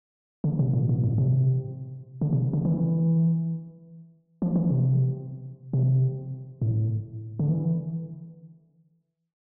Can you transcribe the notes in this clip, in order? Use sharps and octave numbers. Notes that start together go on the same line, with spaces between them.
D3
C3
A#2
A#2
A2
C3
D3
C3
D3
E3
F3
E3
C3
C3
A2
D3
E3